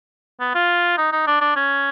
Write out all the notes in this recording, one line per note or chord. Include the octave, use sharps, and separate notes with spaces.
B3
F4
D#4
D#4
D4
D4
C#4